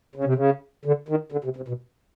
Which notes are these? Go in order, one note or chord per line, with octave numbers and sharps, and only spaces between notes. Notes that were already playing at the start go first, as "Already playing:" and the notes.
C#3
C3
C#3
D3
D#3
D3
C3
C3
B2